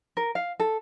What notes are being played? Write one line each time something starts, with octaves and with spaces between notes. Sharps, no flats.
A#4
F5
A4